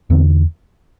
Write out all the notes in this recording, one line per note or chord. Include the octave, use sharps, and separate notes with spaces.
E2 D3 C4